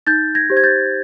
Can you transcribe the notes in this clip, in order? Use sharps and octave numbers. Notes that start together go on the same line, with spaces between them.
D#4 G6 A6
G#6 A#6
G4 C5
G#6
G6 A6